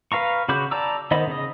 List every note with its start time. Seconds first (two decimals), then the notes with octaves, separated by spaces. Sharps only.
0.12 B4 F5 A#5 C#6
0.49 C#3 F#4 B5 D6 G6
0.71 D5 A5 A#5 D6 E6
1.11 D#3 B3 C5 D#5 B5
1.27 C#3 D#5